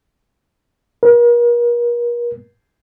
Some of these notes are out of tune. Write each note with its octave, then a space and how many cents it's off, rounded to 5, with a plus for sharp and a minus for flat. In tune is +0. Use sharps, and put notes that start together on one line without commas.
A#4 +40